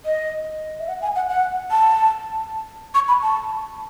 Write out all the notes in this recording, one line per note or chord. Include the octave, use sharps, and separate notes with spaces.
D#5
E5
F#5
G#5
F#5
F#5
A5
C#6
B5
A5